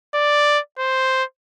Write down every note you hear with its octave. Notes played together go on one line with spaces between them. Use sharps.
D5
C5